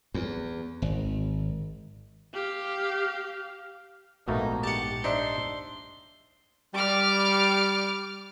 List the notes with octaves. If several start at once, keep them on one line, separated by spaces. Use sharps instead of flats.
E2
G#1
G4 F5
A#1 G#2 B2 A3 A#3 D#4
G4 F#5 A5
D4 D#4 C5 E5 C6
G3 D6 F6